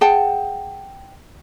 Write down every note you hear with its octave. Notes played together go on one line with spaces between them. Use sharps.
G#4 F#5 G5 A5